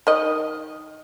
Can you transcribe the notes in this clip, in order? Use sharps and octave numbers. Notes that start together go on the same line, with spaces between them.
D#3 D#5